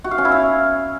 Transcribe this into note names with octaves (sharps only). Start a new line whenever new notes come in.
F#4
F5
C#4
E4
F5